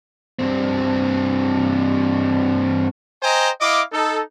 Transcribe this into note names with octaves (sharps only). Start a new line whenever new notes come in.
G2 C4
C5 D#5 G5 G#5 A#5
E4 D#5 F5 D6
D#4 A4